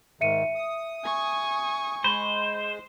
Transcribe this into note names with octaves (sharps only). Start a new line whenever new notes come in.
G#2 D#3 E5 C#7 D#7
D#6
G#5 C#6
G#3 C5 B5